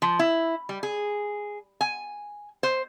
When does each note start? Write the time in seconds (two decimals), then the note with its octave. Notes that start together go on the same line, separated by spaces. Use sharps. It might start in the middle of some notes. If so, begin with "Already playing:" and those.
0.02 F3
0.19 E4
0.69 G3
0.83 G#4
1.81 G#5
2.63 C5